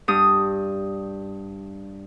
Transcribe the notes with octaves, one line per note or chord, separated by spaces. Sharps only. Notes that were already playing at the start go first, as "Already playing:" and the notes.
G2 D#6